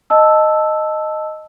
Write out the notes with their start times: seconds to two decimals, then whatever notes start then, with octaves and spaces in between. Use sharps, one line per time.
0.10 D#5 A5 E6